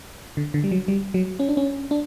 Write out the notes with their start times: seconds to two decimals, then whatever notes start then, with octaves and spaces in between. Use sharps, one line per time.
0.37 D3
0.54 D3
0.64 G3
0.71 F#3
0.88 G3
1.14 F#3
1.39 C#4
1.49 D4
1.57 C#4
1.91 D4